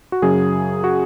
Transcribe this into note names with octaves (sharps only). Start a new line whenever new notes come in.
F#4
F#2 C#3 F#3 G#4
F#4